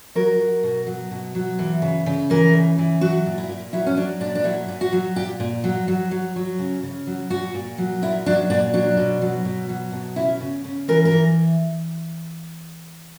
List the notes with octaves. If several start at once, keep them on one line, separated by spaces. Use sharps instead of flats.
F#3 A#4
F#3
B2
F#3
B2
F#3
E3
C#3
C#3
E3 A#4
C#3
E3
F#3 F#4
A#2
E4
A#2
F#3 E4
C#4
F#3 D4
A#2 D4
D4
F#3 E4
A#2
F#4
F#3
A#2 G4
A#2
F#3
F#3
F#3
F#3
C#3
C#3
F#3
A#2 F#4
A#2
F#3
A#2 E4
F#3 D4
A#2 D4
F#3 D4
B2
F#3
B2
F#3
B2
C#3 E4
C#3
C#3
E3 A#4
A#4
E3